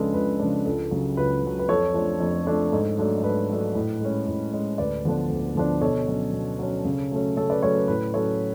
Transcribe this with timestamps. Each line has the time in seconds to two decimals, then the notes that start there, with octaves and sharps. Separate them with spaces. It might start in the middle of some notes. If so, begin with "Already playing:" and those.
Already playing: C#2 C#3 F3 G#3 D4 A4 B4
0.13 C#2 B4
0.40 C#3 F3 G#3 D4
0.66 C#2 A4
0.91 C#3 F#3
1.17 C#2 B4
1.43 C#3 F#3
1.59 B4
1.68 F2 A4 C#5
1.94 F3 A3 D4
2.20 F2
2.47 F3 A3 D4
2.72 G#2 A4
2.98 F#3 A3 D4
3.23 G#2 B4
3.50 F#3 A3 D4
3.75 A2
4.01 G#3 C#4
4.28 A2
4.53 G#3 C#4
4.78 D2 B4 D5
5.05 D3 F3 B3 D4
5.30 D2
5.56 D3 F3 B3 D4
5.81 B2 A4 C#5
6.08 F#3 C#4
6.33 B2
6.59 F#3 C#4
6.85 C#3
7.11 F#3 A3 C#4
7.37 C#3 A4 C#5
7.50 B4 D5
7.63 F#3 A3 C#4 A4 C#5
7.75 B4
7.88 A2 B4
8.14 F#3 C#4 A4 C#5